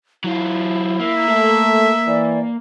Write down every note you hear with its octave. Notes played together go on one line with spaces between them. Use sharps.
F#3 E4 F4
A#3 E5
A3 A4
E3 D5